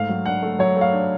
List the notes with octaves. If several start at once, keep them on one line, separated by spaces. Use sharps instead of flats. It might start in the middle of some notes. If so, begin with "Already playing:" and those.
Already playing: G#2 A3 F5
F#3
D4 F#5
A3
F#3 C#5
A3 F5
D4